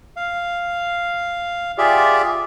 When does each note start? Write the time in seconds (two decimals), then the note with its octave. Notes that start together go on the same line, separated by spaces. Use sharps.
0.16 F5
1.78 F4 G4 G#4 D5 E5